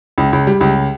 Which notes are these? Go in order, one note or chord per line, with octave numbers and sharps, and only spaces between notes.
C#2
C#2
G3
C#2